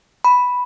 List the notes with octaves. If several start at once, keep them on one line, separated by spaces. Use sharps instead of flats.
B5